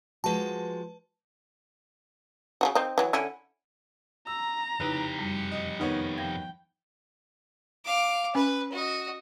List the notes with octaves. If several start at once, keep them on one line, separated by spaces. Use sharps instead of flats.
F3 G#3 F#4 B4 A5
C#3 F4 F#4
C4 D#4
E3 F#3
D3 C#4 E4
A#5 E6
F2 C#3 D#4 E4 G4 B4
F#2 G3 C#7
D#5
D#3 B3 D#4 C#5
F3 G5 A#6
F5 D6
C#4 B4
F#4 D#5